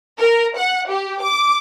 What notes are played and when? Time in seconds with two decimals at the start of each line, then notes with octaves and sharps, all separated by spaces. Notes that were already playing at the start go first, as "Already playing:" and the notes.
0.18 A#4
0.56 F#5
0.89 G4
1.22 D6